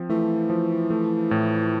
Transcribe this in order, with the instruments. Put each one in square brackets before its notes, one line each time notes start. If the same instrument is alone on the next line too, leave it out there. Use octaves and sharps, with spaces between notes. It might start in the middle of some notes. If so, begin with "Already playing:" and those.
Already playing: [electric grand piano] F3 C4
[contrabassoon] E3 [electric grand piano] A3
[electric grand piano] F3
A3
A2